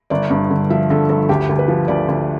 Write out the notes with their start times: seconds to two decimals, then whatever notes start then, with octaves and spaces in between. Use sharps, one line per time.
0.10 G1 D5
0.30 G2
0.50 D3
0.70 F3 E5
0.90 D3 A4
1.10 G1 A4
1.29 D2 G4
1.49 D2
1.59 B4
1.68 F3
1.88 D2 D5
2.08 D2